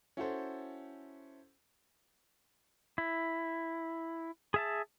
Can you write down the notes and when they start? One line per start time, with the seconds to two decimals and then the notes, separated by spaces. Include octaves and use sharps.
0.17 C#4 E4 F#4 A4 C5
2.98 E4
4.54 G#4 E5 A5